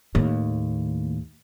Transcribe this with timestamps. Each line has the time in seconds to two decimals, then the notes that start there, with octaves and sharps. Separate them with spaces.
0.15 D#2 A2